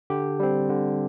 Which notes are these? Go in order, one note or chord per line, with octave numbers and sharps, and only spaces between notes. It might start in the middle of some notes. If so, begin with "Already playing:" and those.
D3 G4
G3 C4
D3